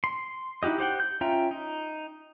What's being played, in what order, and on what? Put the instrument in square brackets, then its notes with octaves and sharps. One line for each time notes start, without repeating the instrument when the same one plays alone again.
[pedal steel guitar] C6
D#4 E4 F#4 G4 D#5
G4 C5 F#5 G5
G6
C#4 F4 E5 G5 A#5
D#4